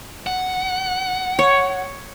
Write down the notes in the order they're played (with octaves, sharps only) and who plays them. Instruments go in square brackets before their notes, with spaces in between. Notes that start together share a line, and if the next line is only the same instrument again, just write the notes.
[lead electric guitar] F#5
[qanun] C#5